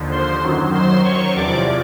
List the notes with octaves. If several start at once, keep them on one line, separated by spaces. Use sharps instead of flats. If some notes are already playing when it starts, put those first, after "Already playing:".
Already playing: D#2 D3 F3
C5 C6
F#2 D#3 F#3
C5 C6
C#5 C#6
E2 C3 F3 D5 D6